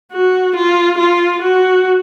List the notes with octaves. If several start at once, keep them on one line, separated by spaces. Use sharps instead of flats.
F#4
F4
F4
F#4